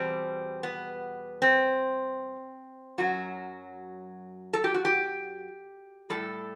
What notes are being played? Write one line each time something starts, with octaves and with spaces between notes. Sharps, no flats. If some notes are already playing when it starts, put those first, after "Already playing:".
Already playing: E2 B2 G3 C4
B3
C4
F#2 F#3 F#4
A4
G4
F#4
G4
A2 G3 A4